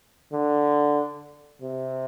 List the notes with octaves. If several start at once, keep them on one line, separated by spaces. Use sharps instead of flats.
D3
C3